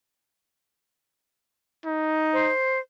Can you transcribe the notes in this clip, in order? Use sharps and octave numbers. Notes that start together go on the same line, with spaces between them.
D#4
C5